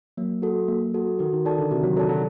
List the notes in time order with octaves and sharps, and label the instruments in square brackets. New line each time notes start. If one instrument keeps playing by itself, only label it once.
[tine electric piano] F#3 [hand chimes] A#3
[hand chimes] F#4 A4
A#3
F#4 A4
[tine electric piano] D#3 [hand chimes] F#4
[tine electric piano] D#3
[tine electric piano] D#3 [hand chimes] A4 D5 A5
[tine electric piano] D3
[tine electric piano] C3 [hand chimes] F#4
[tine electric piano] F#3
[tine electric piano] F#3 [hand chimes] A4 D5 A5
[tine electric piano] F#3